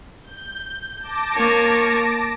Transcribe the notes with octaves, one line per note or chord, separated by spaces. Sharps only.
G6
A5 D6 A#6
A#3 C#5